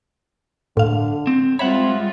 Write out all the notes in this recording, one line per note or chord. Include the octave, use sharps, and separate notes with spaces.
A2 D3 F5
C4
G3 G#3 C4 F4 C#5 E5 F#5 B5